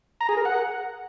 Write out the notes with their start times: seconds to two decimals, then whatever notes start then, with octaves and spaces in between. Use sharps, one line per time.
0.21 A#5
0.29 G#4
0.37 A#4
0.45 F#5